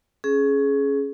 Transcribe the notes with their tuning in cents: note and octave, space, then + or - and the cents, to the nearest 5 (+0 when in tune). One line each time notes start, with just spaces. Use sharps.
C#4 +0 G#4 +20